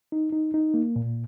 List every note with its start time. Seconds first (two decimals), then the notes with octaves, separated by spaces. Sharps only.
0.12 D#4
0.32 D#4
0.54 D#4
0.74 A#3
0.96 A#2